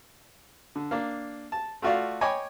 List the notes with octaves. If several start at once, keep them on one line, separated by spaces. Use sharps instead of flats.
D3
A#3 D4
A5
A3 F4 F#4 D5 F5
C#5 D#5 G5 G#5 B5 D6